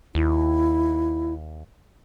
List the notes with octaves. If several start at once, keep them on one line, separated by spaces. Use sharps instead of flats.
D#2 E4